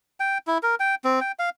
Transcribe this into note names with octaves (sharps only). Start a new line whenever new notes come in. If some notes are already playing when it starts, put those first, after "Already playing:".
G5
E4
A#4
G5
C4
G5
F5